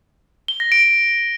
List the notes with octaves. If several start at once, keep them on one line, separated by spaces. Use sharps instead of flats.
G7
A#6
D7